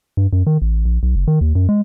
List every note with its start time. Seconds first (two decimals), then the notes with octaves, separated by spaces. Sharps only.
0.17 G2
0.33 F#2
0.47 D#3
0.62 A1
0.85 A#1
1.03 B1
1.16 F#1
1.28 D#3
1.41 D#2
1.55 F#2
1.69 G#3